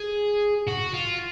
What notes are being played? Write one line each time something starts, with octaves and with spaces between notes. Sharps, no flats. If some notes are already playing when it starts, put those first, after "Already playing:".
Already playing: G#4
F#4
F4